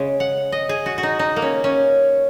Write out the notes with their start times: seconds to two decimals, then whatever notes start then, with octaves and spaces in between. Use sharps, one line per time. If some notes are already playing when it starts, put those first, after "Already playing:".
Already playing: C#3 G#3
0.20 F#5
0.52 D#5
0.69 G#4
0.86 F#4
0.98 F#4
1.03 D#4
1.19 D#4
1.36 A#3
1.42 C#4
1.64 C#4